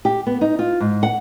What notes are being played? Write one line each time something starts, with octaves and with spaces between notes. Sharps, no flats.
G4
B3
D#4
F4
G#2
F#5